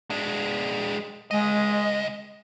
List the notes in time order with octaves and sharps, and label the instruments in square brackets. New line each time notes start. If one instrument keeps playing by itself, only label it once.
[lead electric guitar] G#3 D4
[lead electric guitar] C#2 D#5 [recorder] G#3